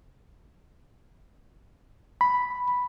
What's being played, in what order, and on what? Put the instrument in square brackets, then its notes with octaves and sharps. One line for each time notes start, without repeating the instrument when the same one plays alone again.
[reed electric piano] B5